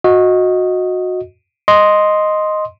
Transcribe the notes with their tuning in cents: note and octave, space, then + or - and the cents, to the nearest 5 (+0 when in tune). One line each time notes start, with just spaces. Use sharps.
F#4 -20 D#5 +10
D#5 +0 C6 +0